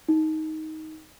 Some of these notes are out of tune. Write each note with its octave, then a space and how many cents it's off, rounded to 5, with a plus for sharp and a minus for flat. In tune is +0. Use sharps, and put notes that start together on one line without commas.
D#4 +15